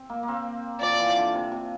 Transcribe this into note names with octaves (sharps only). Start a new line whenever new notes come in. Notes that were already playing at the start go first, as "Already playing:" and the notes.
Already playing: C4
A#3
A#3
C4
F3 D5
E3
D3
C3
C3